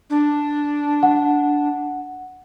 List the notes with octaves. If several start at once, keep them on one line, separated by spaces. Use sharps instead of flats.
D4
F#5